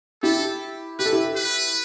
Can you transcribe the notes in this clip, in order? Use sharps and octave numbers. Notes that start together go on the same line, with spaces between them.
E4 G4 A4
G4 B4
A4
E4 G4
B4